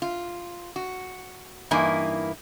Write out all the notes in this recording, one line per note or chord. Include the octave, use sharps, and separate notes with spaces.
F4
F#4
G2 E3 A#3 D#4 E4 G#5